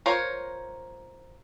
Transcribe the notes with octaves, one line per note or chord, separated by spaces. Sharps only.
F4 A#4 C5 C#5